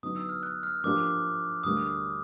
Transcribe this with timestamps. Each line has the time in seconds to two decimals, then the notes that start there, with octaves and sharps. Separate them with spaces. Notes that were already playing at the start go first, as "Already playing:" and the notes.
0.03 D3 F#3 B3 D#4 D#6
0.16 E6
0.29 F6
0.43 F#6
0.63 F6
0.84 F3 A#3 D4 G4 D6
1.63 D2 D3 G3 A#3 D#6